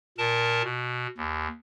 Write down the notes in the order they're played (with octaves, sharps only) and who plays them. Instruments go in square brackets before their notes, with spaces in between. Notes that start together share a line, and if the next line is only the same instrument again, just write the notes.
[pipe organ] A#2 A#4 A5
B2
D#2